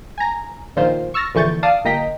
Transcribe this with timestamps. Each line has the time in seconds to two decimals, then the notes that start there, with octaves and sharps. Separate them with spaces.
0.18 G#5 A#5
0.76 A#1 A#2 D#3 F4 C5
1.14 C#6 E6 F6 A6 A#6 C#7
1.35 A#1 D3 E3 C#6 G6 A6
1.63 D5 F5 A5 D#6
1.85 G1 A#3 D#5 G5 A#5 B6